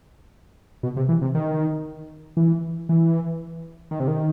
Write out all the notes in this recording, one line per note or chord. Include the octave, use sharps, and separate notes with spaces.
B2
C3
E3
C3
D#3
E3
E3
D#3
C3
D#3